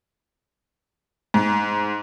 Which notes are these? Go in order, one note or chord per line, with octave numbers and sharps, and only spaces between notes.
G#2